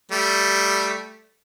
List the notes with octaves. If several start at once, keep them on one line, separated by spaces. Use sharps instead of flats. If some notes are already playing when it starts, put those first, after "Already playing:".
G3 A3